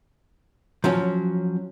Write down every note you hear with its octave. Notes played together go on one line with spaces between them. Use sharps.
F3 F#3 C#4